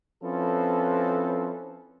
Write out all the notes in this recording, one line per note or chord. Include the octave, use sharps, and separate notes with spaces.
F3 C4 C#4 E4 A4 B4